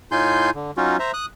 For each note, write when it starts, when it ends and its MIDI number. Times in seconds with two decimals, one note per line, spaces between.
0.12 0.50 45
0.12 0.50 63
0.12 0.50 65
0.12 0.50 80
0.12 0.50 84
0.12 0.50 91
0.55 0.71 50
0.77 0.97 54
0.77 0.97 61
0.77 0.97 63
0.77 0.97 65
0.77 0.97 66
0.99 1.12 72
0.99 1.12 76
0.99 1.12 82
1.14 1.26 87
1.14 1.26 90